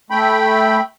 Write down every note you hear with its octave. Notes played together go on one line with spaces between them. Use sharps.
A3 G5 B5